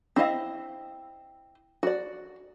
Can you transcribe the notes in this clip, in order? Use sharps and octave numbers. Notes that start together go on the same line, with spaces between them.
C4 E4 D#5 F5
F#4 D5